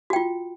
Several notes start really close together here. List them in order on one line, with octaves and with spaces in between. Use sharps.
F#4 G5 F4